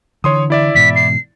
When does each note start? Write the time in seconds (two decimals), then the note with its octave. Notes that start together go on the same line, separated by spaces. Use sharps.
0.24 D3 E3 C#5 C6 D#6
0.50 E4 D5 E5
0.75 G#2 B2 E3 B6
0.95 C7